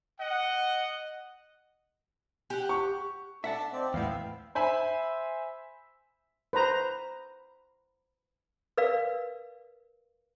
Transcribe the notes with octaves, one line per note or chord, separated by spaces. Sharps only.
D#5 F#5
G4 F#5
C#6
D4 A4 E5 F#5 A5
C4 D#4 D5
E2 A2 B3 E5 F5 G5
C5 E5 G#5 B5
B4 C5 A#5
A#4 B4 D5 F5